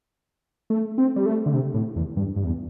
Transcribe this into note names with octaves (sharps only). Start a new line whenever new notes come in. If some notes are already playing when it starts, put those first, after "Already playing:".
A3
C4
G3
A3
D3
C3
A2
E2
G2
G2
E2